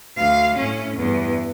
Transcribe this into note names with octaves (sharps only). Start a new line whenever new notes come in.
D2 F5
A2 C#4
E2 G2